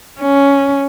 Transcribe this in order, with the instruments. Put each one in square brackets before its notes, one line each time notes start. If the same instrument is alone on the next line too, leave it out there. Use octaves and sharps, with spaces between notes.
[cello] C#4